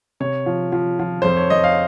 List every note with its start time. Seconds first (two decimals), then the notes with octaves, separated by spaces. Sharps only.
0.20 C3 C#5
0.46 F3
0.72 F3
0.99 F3
1.22 F2 C5
1.36 C#5
1.50 F2 D#5
1.64 F5